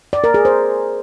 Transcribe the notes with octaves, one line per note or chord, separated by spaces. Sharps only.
D5
A#4
G#4
C5